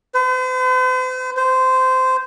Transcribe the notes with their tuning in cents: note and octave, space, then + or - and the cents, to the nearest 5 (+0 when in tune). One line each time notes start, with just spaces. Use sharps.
C5 -45
C5 -20